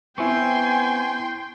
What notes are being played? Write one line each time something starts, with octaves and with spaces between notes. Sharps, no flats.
B3 C4 E4 G5 G#5 C6 C#6